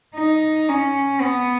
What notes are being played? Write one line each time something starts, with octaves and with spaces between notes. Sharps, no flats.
D#4
C#4
B3